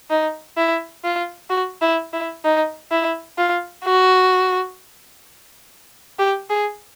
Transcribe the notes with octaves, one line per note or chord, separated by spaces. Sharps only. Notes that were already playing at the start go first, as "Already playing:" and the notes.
D#4
E4
F4
F#4
E4
E4
D#4
E4
F4
F#4
G4
G#4